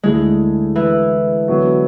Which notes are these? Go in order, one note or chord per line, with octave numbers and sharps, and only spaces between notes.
D2 D3 G#3 A3 E4 G#4
E3
D3 F#3 B3 F#4